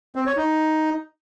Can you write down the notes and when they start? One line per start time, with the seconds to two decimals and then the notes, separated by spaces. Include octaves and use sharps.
0.15 C4
0.26 C#5
0.37 D#4